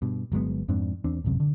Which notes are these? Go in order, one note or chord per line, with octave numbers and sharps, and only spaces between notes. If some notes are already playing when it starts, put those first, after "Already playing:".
G2 B2
G1 F#3 G#3 B3
F2 G#2 C4 D4
E2 C4 D4
D1 G#1 F#2 C3
D3